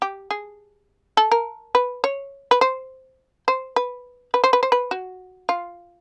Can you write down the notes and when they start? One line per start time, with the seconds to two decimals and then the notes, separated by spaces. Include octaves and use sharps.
0.02 G4
0.31 G#4
1.17 A4
1.31 A#4
1.75 B4
2.04 C#5
2.51 B4
2.61 C5
3.48 C5
3.76 B4
4.34 B4
4.44 C5
4.53 B4
4.63 C5
4.72 B4
4.91 F#4
5.49 F4